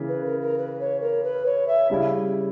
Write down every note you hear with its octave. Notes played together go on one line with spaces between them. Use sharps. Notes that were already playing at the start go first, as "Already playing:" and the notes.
Already playing: C#3 E3 A#3
B4
A#4
A#4
B4
C#5
A#4
B4
C#5
E5
C#3 G3 C#4 E4